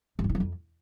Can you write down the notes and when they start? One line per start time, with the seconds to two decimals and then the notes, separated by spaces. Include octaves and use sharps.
0.19 G2
0.24 F3
0.29 D#3
0.35 F#3
0.40 F2